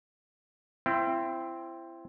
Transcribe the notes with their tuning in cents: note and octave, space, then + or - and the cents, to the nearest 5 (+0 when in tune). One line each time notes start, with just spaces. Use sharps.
C4 +0 E4 +35